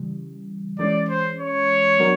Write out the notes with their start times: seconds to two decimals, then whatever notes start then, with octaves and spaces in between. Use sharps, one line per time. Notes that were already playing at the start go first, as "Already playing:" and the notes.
Already playing: C#3 E3 G3
0.79 E3 G#3 C#4 D5
1.09 C5
1.39 C#5
1.99 F#3 B3 D4 F#4 A#4